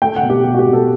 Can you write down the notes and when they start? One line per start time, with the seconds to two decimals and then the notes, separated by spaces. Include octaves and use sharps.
0.02 A3 G5
0.16 F#5
0.23 B2
0.30 G4
0.44 B2 G4
0.54 F#4
0.59 G4
0.67 B2
0.73 A4